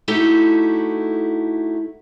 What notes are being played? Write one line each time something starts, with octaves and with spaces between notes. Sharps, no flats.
A3 D#4 E4 F#4 G4 A4